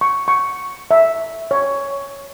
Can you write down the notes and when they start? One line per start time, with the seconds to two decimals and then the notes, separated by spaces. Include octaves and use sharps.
0.01 C#6
0.28 C#6
0.91 E5
1.51 C#5